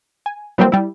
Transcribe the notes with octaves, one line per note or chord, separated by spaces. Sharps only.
G#5
E3 F#3 G3 A#3 C4
G3 E4